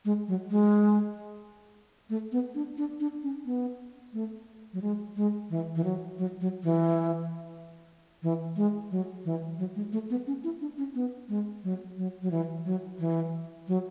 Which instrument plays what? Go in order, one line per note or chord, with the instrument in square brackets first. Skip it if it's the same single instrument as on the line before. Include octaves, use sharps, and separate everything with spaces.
[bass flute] G#3
F#3
G#3
A3
B3
D4
D4
D4
C#4
B3
A3
F#3
G#3
G#3
E3
E3
F#3
F#3
F#3
E3
E3
G#3
F#3
E3
F#3
G#3
A3
B3
C#4
E4
D4
C#4
B3
G#3
F#3
F#3
F#3
E3
F#3
E3
F#3